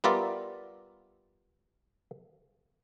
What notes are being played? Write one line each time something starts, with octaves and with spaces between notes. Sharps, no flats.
G3 B3 F4 A#4 D5 E5